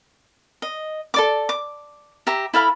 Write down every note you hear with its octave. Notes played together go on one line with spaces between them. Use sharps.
D#5
A4 D5 D6
D6
G4 E5 A#5
E4 A4 F5 B5